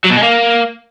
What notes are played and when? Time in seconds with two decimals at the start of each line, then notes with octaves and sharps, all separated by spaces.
0.04 F#3
0.10 B2
0.16 G#3
0.22 A#3